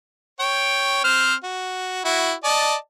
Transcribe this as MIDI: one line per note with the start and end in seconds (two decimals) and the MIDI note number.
0.40 1.03 73
0.40 1.03 79
1.04 1.34 60
1.04 1.34 72
1.04 1.34 89
1.44 2.05 66
2.05 2.33 64
2.05 2.33 66
2.44 2.75 74
2.44 2.75 75
2.44 2.75 81